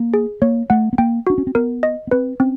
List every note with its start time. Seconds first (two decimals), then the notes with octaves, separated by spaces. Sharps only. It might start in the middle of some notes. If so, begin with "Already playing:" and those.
Already playing: A#3
0.14 G#4
0.42 A#3 C#5
0.70 A3 F#5
0.93 B3
0.98 A#3 G5
1.27 D4 F#4
1.38 C#4
1.47 C4
1.55 B3 A#4
1.83 D#5
2.07 B3
2.11 C4 B4
2.40 C4 C#4